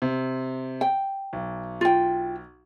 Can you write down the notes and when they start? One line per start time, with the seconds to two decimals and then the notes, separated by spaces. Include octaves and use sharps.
0.02 C3
0.81 G5
1.33 B1
1.81 F4 G5